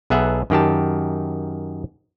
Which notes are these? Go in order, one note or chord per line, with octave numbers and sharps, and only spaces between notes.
B1 B3 G#4 E5 F#5
F#2 D#3 G4 A5